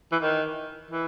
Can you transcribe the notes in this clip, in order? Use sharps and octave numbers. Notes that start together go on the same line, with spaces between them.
E3
D#3
E3